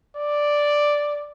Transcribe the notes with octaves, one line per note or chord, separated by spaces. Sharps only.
D5